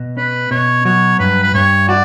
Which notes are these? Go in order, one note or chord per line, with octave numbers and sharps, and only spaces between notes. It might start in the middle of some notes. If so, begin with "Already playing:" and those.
Already playing: B2
C#4 B4
B2 C#5
F#3 C#5
G2 B4
B4
G2 C#5
F#4 D5